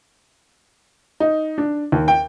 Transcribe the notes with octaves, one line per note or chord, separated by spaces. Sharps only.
D#4
D4
D#2
G5